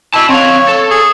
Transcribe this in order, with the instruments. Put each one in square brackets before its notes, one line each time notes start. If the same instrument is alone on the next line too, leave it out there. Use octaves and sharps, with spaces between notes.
[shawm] E4 [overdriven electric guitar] D#5 A5
[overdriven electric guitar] C4 F5 [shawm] C#5
[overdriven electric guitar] A4
[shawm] G#4